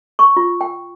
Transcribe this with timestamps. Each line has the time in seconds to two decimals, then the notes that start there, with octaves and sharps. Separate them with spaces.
0.19 C#6
0.36 F4
0.61 G5